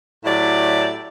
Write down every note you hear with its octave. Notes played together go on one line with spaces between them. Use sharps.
A2 F#3 E4 G4 D5